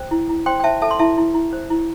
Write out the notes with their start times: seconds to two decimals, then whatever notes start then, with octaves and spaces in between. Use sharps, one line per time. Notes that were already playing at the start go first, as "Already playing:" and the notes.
Already playing: C5 G5
0.11 E4
0.29 E4
0.46 C5 G5 C6
0.60 G5
0.64 C5 E5 A5
0.82 A4 E5 A5
0.91 C6
0.99 E4 E5 A5
1.17 E4
1.34 E4
1.53 C5
1.70 E4